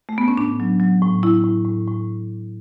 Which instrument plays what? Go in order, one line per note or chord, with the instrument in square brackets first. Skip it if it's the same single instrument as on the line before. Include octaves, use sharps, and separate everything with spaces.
[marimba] A3
B3
C#4
A2 D4
F#3
F#3
A2
A2 E4
A2
A2
A2